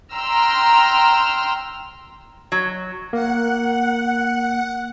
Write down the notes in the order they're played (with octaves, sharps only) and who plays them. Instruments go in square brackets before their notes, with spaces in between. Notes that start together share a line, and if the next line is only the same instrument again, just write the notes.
[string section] G5 A#5 C6 E6 F6
[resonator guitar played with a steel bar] F#3
[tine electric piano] A#3 [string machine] F#5